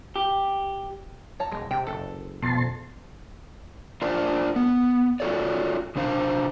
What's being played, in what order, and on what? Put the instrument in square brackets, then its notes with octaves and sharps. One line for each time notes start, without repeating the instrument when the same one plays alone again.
[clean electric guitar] G4
[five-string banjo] C#5 A5 A#5
[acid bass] E1 [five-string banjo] G#3
[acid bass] C3 [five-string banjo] G5
[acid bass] F#1 [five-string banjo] A4
[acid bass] F2 [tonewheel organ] B2 A5 C6
[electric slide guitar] D4 F4 A#4 C5 D5
B3
F4 F#4 A4 C#5 D5
C3 D4 C5 F5